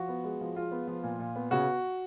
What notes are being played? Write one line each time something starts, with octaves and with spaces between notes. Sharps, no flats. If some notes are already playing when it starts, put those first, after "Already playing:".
Already playing: F3 F#4
B3
G#3
F3
G#3 F4
B3
F3
A#2
A#2
B3
C#3 F#4